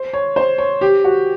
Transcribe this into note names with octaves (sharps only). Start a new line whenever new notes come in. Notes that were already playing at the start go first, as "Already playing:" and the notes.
Already playing: C5
C#5
C5
C#5
G4
F#4